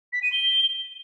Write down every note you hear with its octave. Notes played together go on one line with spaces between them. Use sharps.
B6
D#7
G7